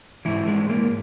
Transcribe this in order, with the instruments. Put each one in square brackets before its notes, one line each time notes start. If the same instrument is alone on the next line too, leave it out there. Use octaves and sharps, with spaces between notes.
[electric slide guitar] G#2 E3 E4
G#3
A#3